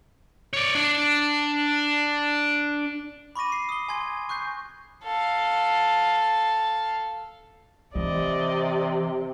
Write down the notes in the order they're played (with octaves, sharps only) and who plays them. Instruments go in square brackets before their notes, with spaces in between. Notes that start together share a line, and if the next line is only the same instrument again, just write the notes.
[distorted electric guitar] C#5 D5
D4
[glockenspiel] B5 C#6 D6 A#6 D#7
C7
D#6 G7
G#5 C6 G#6
C#6 F#6 G6 C7
[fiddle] A4 F5
[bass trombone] C3 [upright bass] E3 [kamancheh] D5 D#5